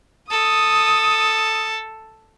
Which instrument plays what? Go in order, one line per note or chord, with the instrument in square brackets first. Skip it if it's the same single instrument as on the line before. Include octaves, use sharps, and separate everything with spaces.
[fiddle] A4 [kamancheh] D#6